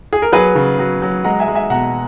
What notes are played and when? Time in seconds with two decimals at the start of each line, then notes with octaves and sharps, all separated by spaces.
0.13 G#4
0.22 A#4
0.32 F#3 G#4 B4
0.55 C#3
0.79 F#3
1.02 F#3
1.24 G#3 F#5 A#5
1.40 E5 G#5
1.47 G#3
1.55 E5 G#5
1.70 B2 F#5 A#5